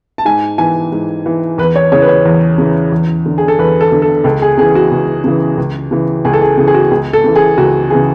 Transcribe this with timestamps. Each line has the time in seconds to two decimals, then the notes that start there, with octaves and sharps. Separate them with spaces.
0.18 A5
0.25 G#2 G#5
0.58 E3 G#5
0.92 G#2
1.26 E3
1.58 E2 B4
1.76 C#5
1.92 C#3 C#5
1.95 E3
2.02 B4
2.08 C#5
2.25 E2
2.58 C#3 E3
2.92 E2
3.26 D3
3.38 G#4
3.48 A4
3.59 E2 B4
3.81 A4
3.92 D3
4.02 A4
4.24 C#2 A4
4.42 G#4
4.58 C#3 G#4
4.62 E3
4.75 F#4
4.92 C#2
5.24 C#3 E3
5.58 C#2
5.91 C#3 E3
6.25 C#2 G#4
6.33 A4
6.42 G#4
6.57 C#3 E3 G#4
6.67 G#4
6.74 F#4
6.91 C#2 G#4
7.13 A4
7.24 C#3 E3
7.36 G#4
7.58 C#2 F#4
7.90 C#3 E3 G#4